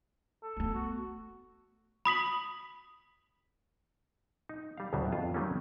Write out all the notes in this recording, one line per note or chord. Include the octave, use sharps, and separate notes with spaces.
A4
A3 B3
F#4
B5 D#6 B6 F#7
D#4
G3 F5
D2 A2 C#3 F#3 G3 E5
F2 B3 F4 A5
D#3 F#3 G3 A3 A#3 C#4